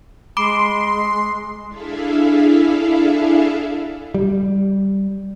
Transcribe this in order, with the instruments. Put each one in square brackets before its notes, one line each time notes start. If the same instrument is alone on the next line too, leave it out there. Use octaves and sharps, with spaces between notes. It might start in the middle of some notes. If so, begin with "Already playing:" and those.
[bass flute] G#3 [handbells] B5 D6 D7 [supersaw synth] C6
[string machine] D4 E4 G#4 A4 E5 F5
[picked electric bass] G3